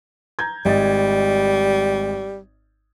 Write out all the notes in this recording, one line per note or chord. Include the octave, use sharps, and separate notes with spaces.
A#5 G6 G#6
G#1 G3 D#5 A6